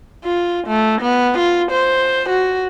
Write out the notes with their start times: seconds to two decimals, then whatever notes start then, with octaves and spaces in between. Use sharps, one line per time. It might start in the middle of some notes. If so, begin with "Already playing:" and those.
0.25 F4
0.67 A3
1.02 B3
1.38 F4
1.72 C5
2.29 F#4